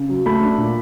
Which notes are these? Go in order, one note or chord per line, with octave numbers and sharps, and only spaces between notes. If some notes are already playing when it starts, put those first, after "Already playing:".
Already playing: C#3
F#3
A3 B5
D4
A#2